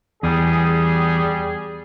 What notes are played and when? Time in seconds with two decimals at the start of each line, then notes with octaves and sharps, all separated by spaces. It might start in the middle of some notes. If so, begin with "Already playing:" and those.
0.23 E2 G3 G#4